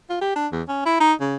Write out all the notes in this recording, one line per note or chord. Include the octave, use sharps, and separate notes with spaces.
F4
G4
D4
E2
C#4
E4
D#4
C#3